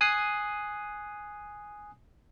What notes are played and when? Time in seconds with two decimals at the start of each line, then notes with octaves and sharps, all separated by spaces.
0.01 G#5 D#6 F#6 C7